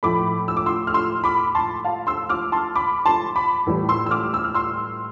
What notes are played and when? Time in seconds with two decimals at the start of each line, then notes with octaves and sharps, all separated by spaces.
0.03 A2 F3 A3 B5 D6
0.48 E6
0.57 D6
0.66 C6 E6
0.87 F6
0.94 C6 E6
1.24 B5 D6
1.55 A5 C6
1.84 F5 A5
2.07 C6 E6
2.29 D6 F6
2.52 A5 C6
2.76 B5 D6
3.06 A5 C6
3.36 B5 D6
3.67 A2 E3 G3
3.89 C6 E6
4.06 E6
4.11 D6 F6
4.34 E6
4.44 F6
4.54 C6 E6